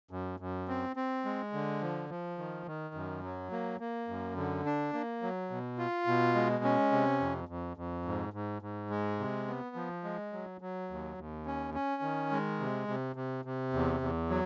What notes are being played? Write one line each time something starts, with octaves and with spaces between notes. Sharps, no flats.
F#2
F#2
C4
C4
G#3
D3
F3
F3
D#3
D#3
F#2
F#3
A#3
A#3
F#2
D3
D4
A#3
F#3
B2
F4
B2
G#3
C#4
C3
F2
F2
F2
G#2
G#2
G#2
G#3
C3
B3
F3
G#3
F#3
F#3
D#2
D#2
C#4
C#4
D#3
G#3
C3
C3
C3
C3
E2
E2
F#3